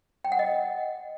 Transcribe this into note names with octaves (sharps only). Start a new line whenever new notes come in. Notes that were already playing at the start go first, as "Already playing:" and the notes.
G5
F#5
D#5